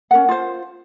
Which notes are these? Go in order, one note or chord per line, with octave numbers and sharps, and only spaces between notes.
C#4 A#4 F#5
F4 C5